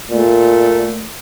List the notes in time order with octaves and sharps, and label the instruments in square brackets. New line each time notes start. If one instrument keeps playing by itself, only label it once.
[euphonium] A#2 [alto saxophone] A3